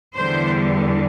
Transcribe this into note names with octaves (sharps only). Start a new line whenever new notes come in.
E2 D3 G3 C5